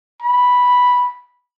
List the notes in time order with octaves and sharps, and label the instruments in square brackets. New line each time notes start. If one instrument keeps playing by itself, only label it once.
[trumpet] B5